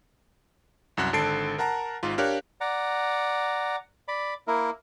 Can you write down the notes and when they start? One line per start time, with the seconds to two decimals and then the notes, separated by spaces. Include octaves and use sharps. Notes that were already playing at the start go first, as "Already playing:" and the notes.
0.97 C2 F#2 F#4 F#6
1.13 G#1 D3 A4 A5 C7 D7
1.58 A#4 F#5 A5 A#5
2.03 G#1 G#2 F4
2.18 D4 G4 A#4 C#5 F5 F#6
2.61 D5 F#5 A#5
4.08 D5 B5
4.47 A#3 E4 A#4